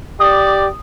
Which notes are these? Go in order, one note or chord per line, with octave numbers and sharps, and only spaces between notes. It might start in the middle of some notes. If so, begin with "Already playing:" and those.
G4 D5 D#6